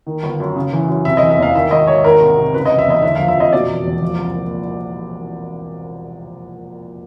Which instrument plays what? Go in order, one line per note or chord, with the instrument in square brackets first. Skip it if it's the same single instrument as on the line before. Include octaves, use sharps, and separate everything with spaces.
[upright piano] D#3
G1
F#2
C#3
E3
F#2
C3 E5
E3 D#5
E5
E2 F5
D#3 E5
G#1 D#5
G#2 C#5
D#3 A#4
C2
C3
C#3 B4
D#5
E1
E5
E2 D#5
D3 E5
F3 F5
E5
F2 D#5
B2 D5
E1
E2
F3
C2
A#2